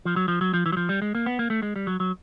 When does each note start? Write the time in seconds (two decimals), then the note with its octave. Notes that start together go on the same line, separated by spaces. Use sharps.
0.05 F3
0.16 F#3
0.28 F3
0.41 F#3
0.54 F3
0.66 E3
0.72 F#3
0.77 F3
0.89 G3
1.02 G#3
1.15 A#3
1.26 B3
1.39 A#3
1.50 A3
1.63 G#3
1.76 G3
1.87 F#3
2.00 F#3